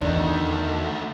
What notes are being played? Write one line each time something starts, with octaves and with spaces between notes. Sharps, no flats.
E2 D3 D#3 A3 D4 D#4